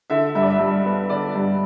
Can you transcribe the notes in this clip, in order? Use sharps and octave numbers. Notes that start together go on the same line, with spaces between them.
D3 E5
G2 E5
D5
E5
G2
B3
D3 D5
G2